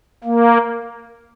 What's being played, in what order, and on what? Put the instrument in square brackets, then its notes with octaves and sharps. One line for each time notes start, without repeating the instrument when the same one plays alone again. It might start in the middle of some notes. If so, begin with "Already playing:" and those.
[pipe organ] A#3